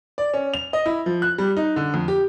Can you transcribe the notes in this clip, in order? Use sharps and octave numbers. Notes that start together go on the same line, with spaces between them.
D5
C#4
F7
D#5
E4
F3
F#6
G3
D#4
D3
F2
G4